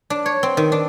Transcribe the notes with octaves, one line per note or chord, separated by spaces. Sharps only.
D4
C#5
C4
D#3
D4